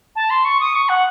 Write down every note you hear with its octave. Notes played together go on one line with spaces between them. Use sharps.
A5
C6
C#6
D#6
C#6
F#5